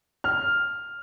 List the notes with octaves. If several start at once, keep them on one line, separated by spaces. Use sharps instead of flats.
F6